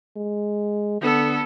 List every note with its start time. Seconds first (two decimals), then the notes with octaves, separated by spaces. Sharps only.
0.17 G#3
1.01 D3 B3 A4